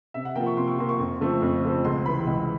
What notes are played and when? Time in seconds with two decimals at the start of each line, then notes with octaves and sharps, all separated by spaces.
0.14 C3 E5
0.25 F#5
0.35 F3 A#3 G5
0.46 C#6
0.57 C3 C6
0.68 C#6
0.79 F3 A#3 C6
0.89 C#6
0.99 F2
1.21 C#3 F3 A3 C4
1.42 F2
1.63 C#3 F3 A3 C4
1.84 C#2 C6
2.06 C3 E3 B5
2.27 C#2